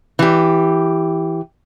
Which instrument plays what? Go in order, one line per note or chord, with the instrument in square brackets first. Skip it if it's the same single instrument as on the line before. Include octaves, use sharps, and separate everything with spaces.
[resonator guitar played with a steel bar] E3 G4